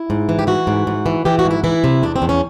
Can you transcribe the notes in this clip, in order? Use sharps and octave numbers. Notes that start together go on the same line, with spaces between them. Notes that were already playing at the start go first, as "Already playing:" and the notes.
Already playing: E4
G#2
E3
G4
E3 F#4
G#2
G#2
E3
E3 G4
F#4
G#2
E4
E3 E4
C3
E2 D4
C4
E2
C#4